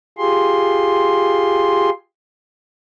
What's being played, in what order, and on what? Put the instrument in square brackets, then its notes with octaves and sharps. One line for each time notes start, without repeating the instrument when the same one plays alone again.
[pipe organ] F4 G4 G#4 C6